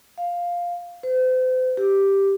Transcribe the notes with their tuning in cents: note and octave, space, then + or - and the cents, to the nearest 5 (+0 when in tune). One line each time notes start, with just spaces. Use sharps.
F5 +5
C5 -40
G4 +0